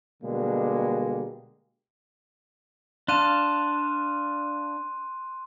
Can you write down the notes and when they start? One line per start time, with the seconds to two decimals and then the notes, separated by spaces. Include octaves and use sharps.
0.23 B2 D3 G3 G#3 A#3
3.08 D4 F5 A5 C6 F#6 D#7